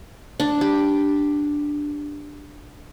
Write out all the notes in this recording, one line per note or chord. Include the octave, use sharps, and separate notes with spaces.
D4
G4